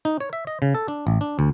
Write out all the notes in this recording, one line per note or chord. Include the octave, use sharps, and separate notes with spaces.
D#4
C#5
E5
D#5
C#3
A4
D4
A1
D4
D2